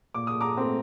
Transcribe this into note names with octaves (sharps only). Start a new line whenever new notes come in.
A#2 D6
D#6
A#5 D6
A3 C4